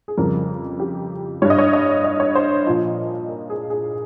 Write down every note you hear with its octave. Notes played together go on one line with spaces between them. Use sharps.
G#4
F2 C#3 G3 A#4
G4
G2 G3 C#5
D#5
C#5
D#5
D#5
C#5
C5
A#2 F3 D#5
A#4
G#4
G#4